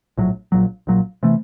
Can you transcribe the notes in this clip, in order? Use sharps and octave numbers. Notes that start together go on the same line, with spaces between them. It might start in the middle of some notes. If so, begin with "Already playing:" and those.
A#1 A2 F#3
A#1 A#2 F#3
A#1 A#2 F#3
C3 E3 A3